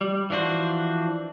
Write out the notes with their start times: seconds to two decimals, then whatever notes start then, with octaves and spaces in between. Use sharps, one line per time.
0.01 G3
0.30 E3 F3 D4 F#4 C5